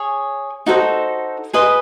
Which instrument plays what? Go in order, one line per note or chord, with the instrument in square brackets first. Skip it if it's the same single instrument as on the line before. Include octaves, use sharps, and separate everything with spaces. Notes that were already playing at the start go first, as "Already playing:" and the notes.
Already playing: [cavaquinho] G#4 C#5
D#4 F#4 A4 C5
G#4 B4 D#5 C6